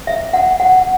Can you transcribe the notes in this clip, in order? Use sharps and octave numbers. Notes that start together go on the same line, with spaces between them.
E5
F#5
F#5